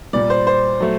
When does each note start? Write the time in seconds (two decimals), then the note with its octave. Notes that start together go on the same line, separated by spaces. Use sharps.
0.13 A#2 G3 D5
0.30 C5
0.47 C5
0.80 F#3 A3